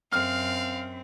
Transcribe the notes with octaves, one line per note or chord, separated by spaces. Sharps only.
F#2 C4 F5 F6